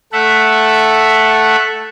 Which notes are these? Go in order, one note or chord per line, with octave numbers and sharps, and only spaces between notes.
A3 A4 E5 F#5